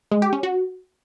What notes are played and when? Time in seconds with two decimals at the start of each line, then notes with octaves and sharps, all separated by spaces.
0.11 G#3
0.22 G4
0.33 C#4
0.43 F#4